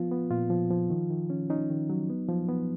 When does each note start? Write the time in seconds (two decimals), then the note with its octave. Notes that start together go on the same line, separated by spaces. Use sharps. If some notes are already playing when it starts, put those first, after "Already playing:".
Already playing: F3 B3 F4
0.11 B3
0.31 A#2 F4
0.50 F3
0.71 F3
0.90 D#3
1.10 D#3
1.30 C#4
1.50 C#4 D#4
1.70 D#3
1.90 F#3
2.10 B3
2.29 F3
2.49 B3